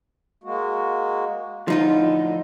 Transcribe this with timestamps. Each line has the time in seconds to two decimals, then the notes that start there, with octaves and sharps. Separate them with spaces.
0.44 G#3 A#3 F#4
1.68 A2 D3 F3 D#4 F4